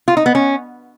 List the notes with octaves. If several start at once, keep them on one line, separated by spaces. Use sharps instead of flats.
F4
D#4
B3
C#4